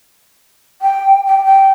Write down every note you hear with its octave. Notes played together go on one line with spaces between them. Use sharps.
G5
G5
G5